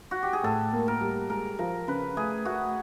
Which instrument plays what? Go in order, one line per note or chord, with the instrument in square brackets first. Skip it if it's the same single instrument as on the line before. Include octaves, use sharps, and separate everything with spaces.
[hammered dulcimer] F#4
G4
G#4
[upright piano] A2 [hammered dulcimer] A4
[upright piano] A#3
[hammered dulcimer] A#4
[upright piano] G3
[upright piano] G#3 [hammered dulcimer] A#4
[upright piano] F3 [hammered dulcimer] A#4
[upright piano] C#3 [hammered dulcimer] B4
[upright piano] A3 [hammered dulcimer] G#4
[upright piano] A3 [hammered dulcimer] F#4